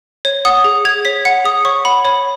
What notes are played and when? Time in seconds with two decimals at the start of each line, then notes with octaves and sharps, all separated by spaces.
0.25 C#5
0.45 F#5 D#6
0.64 G#4
0.85 G#4 G#6
1.05 C#5 B6
1.25 F#5 C#7
1.44 G#4 D#6
1.65 C#5 C#6
1.85 F#5 B5
2.05 C#5 B5